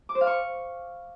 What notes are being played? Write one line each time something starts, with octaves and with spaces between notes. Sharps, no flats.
D6
C5
F5
C#6